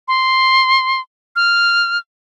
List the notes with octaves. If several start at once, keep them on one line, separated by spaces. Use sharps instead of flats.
C6
F6